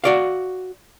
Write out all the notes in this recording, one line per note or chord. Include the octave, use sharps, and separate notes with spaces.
F#4 D5 F5